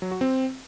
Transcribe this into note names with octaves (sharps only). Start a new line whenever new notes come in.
F#3
F#4
C4